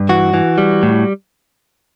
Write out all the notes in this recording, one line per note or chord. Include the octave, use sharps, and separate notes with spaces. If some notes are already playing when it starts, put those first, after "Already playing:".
Already playing: G2
E3 F#4
E3
G3
A2